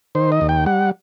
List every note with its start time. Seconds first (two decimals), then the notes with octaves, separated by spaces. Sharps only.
0.15 D#3 C5
0.32 D#5
0.41 D#2
0.49 G5
0.66 G3 F#5